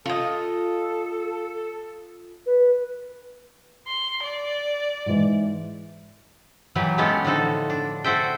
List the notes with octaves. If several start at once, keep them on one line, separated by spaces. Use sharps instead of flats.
F4 A4 D#5
B4
C6
D5
G#2 E3
A#2 E3 F#3 G4 B4
G#3 A3 B3 C#4 G4 A4
A2 D3 F3 D#4 F#4 A4
D4
F#4 A4 C5 E5 G5